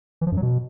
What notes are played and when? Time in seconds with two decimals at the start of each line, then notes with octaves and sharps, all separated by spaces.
0.21 E3
0.27 F3
0.32 F#2
0.37 F#3
0.42 B2